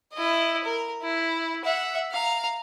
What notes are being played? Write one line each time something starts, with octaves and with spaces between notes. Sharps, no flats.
E4 D#5
A#4
E4
E5 F#5
F5 A#5